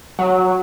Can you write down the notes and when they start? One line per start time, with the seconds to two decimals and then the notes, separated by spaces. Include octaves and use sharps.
0.19 F#3